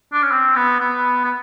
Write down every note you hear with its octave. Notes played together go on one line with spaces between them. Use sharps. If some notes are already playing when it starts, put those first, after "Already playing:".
D4
C#4
C4
B3
B3
B3